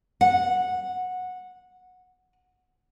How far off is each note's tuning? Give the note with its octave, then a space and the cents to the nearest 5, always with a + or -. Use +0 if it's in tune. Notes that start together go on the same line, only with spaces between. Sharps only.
F#5 -15